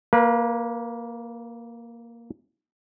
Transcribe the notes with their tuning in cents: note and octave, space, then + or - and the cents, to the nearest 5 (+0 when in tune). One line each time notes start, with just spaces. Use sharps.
A#3 +0 B4 -35